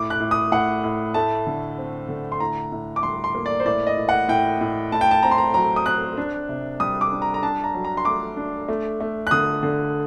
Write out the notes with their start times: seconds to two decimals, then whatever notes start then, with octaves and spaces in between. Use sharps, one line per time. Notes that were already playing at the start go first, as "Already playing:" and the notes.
Already playing: A2 D6
0.10 F#6
0.20 A2
0.31 D#6
0.52 A2 F#5
0.84 A2
1.14 A3 A5
1.47 D3
1.78 C4
2.09 D3
2.32 C6
2.40 A2 A#5
2.72 A2
2.96 D6
3.03 G3 C6
3.24 C6
3.35 A#3
3.46 D5
3.60 C5
3.66 A2 D5
3.87 D#5
3.97 A2
4.09 F#5
4.28 A2 G5
4.61 A2
4.92 A2 A5
5.01 G5
5.11 A5
5.23 C4 A#5
5.31 C6
5.38 A#5
5.54 F#3 A#5
5.76 D#6
5.85 C4 F#6
6.17 D4
6.49 C3
6.80 G3 D#6
7.01 D6
7.12 D4
7.22 A#5
7.34 A#5
7.43 D4 A5
7.64 A#5
7.74 F#3
7.85 A#5
7.97 C6
8.05 A3 D6
8.37 D4
8.68 A3
9.00 A3
9.27 F#6
9.31 D3 D#6
9.63 D3